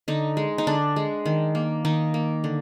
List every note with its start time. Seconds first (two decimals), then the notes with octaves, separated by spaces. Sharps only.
0.08 D3 D#4
0.37 G#3
0.58 D#4
0.67 D3 D4
0.96 G#3
1.25 D#3
1.55 A#3
1.85 D#3 D#4
2.14 A#3
2.44 D3